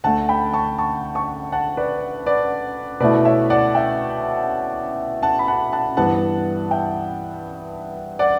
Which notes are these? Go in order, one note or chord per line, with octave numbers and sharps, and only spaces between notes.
D2 D3 A3 F#5 A5
G5 B5
A5 C#6
A5 C#6
A5 C#6
F#5 A5
B4 D5
B4 D5
B2 A3 E4 B4 D5
C#5 E5
D5 F#5
E5 G5
F#5 A5
B5
F#5 A5
F#5 A5
G2 E3 G3 B3 F#5 A5
E5 G5
D5 F#5